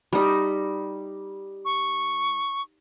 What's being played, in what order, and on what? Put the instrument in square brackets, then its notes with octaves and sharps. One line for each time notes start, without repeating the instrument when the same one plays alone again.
[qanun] G3 D#4
[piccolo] C#6